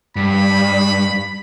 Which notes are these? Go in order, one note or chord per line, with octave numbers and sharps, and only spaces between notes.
G2 B5